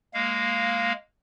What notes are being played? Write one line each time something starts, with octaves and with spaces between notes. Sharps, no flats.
G#3 A#3 F5